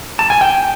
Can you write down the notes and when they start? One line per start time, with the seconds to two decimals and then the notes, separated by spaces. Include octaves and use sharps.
0.19 A5
0.30 G#5
0.41 G5